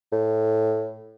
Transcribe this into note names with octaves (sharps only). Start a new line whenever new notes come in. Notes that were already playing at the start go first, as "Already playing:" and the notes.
A2